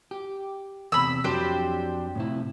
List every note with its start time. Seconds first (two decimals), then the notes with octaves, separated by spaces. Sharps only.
0.11 G4
0.92 E2 C3 B5 E6
1.24 F2 F#3 D4 G4 C5
2.15 A2 C3 E4